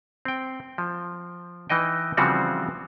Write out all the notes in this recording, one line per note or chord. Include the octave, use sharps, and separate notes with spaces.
C4 G5
F3
E3 D#4 D#5 G5
C#3 E3 F3 G3 C4 F#4